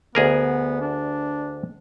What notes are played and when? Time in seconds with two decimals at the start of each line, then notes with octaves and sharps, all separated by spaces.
0.15 D2 B3 G#4 A#4
0.81 D4